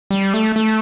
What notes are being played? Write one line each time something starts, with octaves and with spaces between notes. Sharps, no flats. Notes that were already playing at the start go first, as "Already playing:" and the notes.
G3
A3
A3